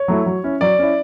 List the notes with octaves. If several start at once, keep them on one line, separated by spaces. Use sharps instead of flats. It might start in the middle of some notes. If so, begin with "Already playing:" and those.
Already playing: C#5
F#3 A3 E4
F#3
C#4 E4
F#3 D5
C#4 E4